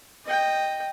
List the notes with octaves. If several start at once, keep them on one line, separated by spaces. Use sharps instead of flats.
D#5 G5